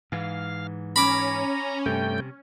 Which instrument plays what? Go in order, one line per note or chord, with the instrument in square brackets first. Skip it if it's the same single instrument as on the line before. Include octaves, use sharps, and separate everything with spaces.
[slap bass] G#2 E3 [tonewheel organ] F5
[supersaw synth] C#4 [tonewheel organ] A#5 [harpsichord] B5 D6
[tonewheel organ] G2 A3 G5 [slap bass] C3